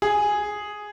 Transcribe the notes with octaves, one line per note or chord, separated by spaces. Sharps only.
G#4